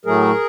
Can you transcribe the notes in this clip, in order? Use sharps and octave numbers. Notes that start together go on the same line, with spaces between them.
A2 F#3 A3 G#4 A#4